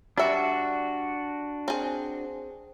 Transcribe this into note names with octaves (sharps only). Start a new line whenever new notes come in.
G3 D4 F#4 E5
C4 G#4